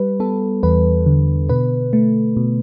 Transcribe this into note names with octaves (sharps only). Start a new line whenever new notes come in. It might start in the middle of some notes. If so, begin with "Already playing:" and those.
Already playing: G3 B4
B3 A4
E2 B4
D3
B2 B4
A3
B2